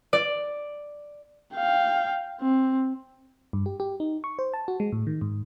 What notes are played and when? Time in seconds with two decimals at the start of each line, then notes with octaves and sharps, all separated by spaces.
0.13 D5
1.54 F5 G5
2.41 C4
3.53 G2
3.66 G4
3.80 G4
4.00 D#4
4.24 C#6
4.39 C5
4.54 A5
4.68 F#4
4.80 G#3
4.92 A2
5.07 D#3
5.21 G#2